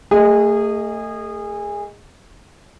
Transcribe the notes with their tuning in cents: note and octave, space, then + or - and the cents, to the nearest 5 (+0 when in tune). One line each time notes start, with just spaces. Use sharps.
A3 +35 G#4 -25 D#5 +0